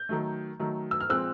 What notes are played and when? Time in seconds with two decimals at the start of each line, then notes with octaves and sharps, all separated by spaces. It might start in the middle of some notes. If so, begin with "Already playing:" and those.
Already playing: G6
0.09 D#3 F#3 A3
0.60 D#3 F#3 A3
0.91 E6
1.00 F6
1.10 A#2 F3 G#3 C4 E6 F#6